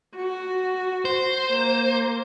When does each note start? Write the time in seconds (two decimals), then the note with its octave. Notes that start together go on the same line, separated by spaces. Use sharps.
0.16 F#4
1.05 C5
1.50 A#3